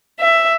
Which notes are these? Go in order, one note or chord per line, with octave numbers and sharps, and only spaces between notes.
E5